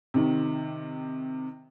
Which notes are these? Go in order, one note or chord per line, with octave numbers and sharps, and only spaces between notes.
C3 D#3